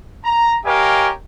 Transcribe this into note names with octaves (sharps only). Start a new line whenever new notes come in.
A#5
G4 A#4 C#5 D#5 F5 G#5